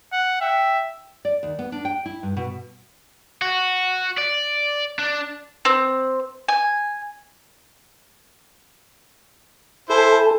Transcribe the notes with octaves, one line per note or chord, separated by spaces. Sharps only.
F#5
E5 G5
D5
D#2
B3
D4
G5
E4
G2
B2
F#4
D5
D4
C4
G#5
E4 A4 C5 G#5 A5